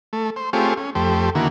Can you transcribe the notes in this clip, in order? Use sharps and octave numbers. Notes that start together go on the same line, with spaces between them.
A3
C5
A3 C4 F4 G4 G#4 C#5
C#4
F2 A3 G4 C5
D3 D#3 A#3 E4 F#4